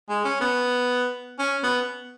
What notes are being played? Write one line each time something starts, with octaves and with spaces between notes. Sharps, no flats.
G#3
C#4
B3
C#4
B3